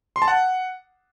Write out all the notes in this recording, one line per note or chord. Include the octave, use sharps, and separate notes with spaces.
C6
A5
F#5